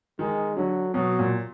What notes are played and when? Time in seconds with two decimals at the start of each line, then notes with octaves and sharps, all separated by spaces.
0.19 D#3 G#3
0.56 D3 F#3
0.94 B2 F#3
1.19 A#2